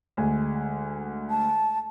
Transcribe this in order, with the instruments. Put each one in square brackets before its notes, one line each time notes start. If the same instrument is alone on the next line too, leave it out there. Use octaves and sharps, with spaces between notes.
[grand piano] D2 G#3 G#5
[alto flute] A5